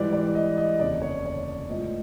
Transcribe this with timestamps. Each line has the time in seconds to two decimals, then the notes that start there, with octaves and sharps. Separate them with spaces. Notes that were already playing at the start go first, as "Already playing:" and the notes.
Already playing: G#2 E3 G3 D5
0.13 D5
0.35 D#5
0.58 D#5
0.79 F1 D#2 C#3 D5
1.02 C#5
1.25 C#5
1.69 A2 F3 G#3 B3 E4 D#5